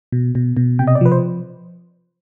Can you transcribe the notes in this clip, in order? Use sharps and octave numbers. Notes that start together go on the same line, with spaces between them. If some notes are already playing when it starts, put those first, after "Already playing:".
B2
B2
B2
C3 G5
D#5
D5
F3 B4
C5